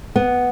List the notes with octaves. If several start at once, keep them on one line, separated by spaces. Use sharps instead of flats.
B3